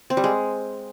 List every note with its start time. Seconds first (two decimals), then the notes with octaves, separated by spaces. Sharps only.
0.10 C4
0.17 G3
0.24 G#3